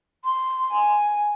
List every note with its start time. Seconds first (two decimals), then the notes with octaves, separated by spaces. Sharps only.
0.24 C6
0.71 G#5